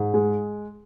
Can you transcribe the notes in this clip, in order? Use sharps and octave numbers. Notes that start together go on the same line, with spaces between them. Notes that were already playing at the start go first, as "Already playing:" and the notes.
Already playing: G#2
G#3